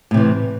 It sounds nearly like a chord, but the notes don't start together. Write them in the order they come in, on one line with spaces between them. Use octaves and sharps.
A2 C3 E3